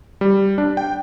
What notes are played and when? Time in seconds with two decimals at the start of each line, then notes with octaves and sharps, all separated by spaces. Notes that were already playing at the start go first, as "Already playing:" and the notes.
0.21 G3
0.58 D4
0.77 G5